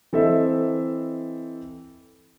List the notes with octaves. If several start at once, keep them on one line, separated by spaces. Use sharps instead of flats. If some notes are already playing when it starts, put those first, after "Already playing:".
E3 C4 A4 C5 D#5 E5